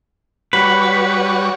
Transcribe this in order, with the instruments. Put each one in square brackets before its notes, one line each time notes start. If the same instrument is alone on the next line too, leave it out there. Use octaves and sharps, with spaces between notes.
[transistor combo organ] G3 F#4 C#5 [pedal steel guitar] B4